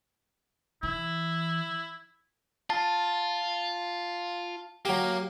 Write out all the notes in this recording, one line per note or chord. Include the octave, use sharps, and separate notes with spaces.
E3 E4
F4 A5
F#3 A#3 G4